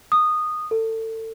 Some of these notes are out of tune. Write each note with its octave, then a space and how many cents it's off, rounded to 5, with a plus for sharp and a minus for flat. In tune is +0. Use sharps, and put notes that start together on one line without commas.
D#6 -15
A4 +25